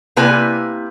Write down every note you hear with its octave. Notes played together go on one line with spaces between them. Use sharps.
C3 A#3 E4 B4 G#5